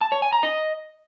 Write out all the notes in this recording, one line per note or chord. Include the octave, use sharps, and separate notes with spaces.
A5
C#5
G#5
A#5
D#5